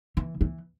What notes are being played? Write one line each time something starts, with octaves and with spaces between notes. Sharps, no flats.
E3
E3